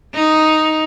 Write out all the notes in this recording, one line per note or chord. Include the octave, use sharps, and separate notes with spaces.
D#4